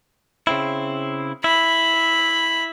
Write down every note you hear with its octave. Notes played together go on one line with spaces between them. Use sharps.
C#3 C4 E4
E4 B5